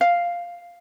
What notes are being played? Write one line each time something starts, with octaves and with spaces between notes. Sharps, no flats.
F5